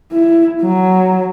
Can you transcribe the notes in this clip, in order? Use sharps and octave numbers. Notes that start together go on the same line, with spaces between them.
E4
F#3